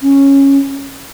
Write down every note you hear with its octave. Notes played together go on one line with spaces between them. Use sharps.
C#4